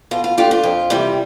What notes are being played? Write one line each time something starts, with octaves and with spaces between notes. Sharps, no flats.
B2 F4
F4
A3 D4 F4 G4
F4
F2
C3 E3 G3